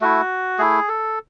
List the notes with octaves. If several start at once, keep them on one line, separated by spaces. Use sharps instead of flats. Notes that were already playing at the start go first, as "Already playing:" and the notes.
A3 E4 F#4
A3 E4 G#4
A4